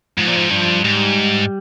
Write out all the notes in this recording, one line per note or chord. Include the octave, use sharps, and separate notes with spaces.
G#2 F3
A#2
G#2
G2 F3
G#2 G3